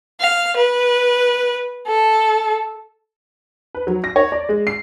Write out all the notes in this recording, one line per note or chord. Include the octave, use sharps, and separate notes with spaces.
F5
B4
A4
B4
F#3
A#6
C#5
D5
G#3
C7